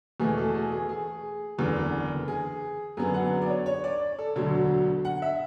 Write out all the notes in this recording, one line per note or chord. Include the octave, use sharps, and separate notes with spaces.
E2 B2 A3 G#4
A4
G#4
G#4
G#4
F#1 E2 D3
G#4
F#2 D3 F#3 B3 G#4
F#5
D5
C#5
C#5
D5
A4
E1 D2 D3 F#3
F#5
E5